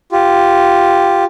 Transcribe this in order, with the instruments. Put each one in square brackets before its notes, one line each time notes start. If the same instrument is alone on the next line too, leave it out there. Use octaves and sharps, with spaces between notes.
[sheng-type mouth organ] F4 G4